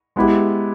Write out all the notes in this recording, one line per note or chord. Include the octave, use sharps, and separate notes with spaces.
G#3 B3 E4 G4